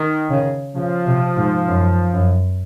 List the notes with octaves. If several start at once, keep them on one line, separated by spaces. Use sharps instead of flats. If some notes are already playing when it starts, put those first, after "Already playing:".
Already playing: D#3
C#3
C#3 F3
C3
G#2
F#2
F#2